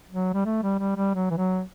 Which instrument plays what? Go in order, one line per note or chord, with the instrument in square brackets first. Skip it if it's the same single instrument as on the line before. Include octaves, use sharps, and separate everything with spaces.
[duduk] F#3
G3
A3
G3
G3
G3
F#3
E3
F#3